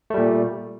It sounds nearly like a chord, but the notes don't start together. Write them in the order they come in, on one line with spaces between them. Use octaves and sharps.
A3 G3 A#2